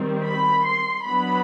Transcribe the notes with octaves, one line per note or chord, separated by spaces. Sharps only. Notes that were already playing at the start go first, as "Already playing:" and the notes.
Already playing: D#3 G3 C4
B5
C6
F#3 B3 D4 B5